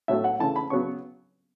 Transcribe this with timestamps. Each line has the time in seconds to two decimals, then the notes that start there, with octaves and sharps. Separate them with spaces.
0.08 A2 F#3 A3 E5
0.24 F#5
0.39 C#3 E3 A3 A5
0.56 B5
0.70 C#3 F#3 B3 C#6